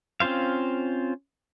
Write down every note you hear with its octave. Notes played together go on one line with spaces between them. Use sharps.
C4 C#4 F4 C5 F5